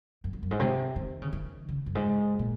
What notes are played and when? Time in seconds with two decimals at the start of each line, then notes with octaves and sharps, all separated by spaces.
0.24 F#2
0.33 F2
0.43 F#2
0.51 G#2
0.60 C3
0.96 D#3
1.22 C#3
1.33 D#3
1.68 C#3
1.86 F#2
1.95 G#2
2.39 A#2